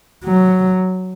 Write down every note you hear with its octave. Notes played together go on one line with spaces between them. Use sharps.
F#3